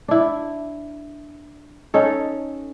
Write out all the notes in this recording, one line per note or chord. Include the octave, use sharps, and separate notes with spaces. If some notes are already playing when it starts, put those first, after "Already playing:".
D4 E4
C#4 D#4 A4